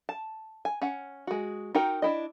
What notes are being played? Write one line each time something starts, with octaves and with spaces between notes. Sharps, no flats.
A5
G#5
C#4 F#5
G#3 F#4
D#4 F#4 A#4 G5
D4 E4 D#5